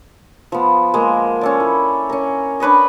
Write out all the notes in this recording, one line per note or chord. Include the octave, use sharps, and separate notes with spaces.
F3 B3
G#3 A#3
C#4 A4 D5
E4
C#4 A#4
D4 B4 C#5 D#5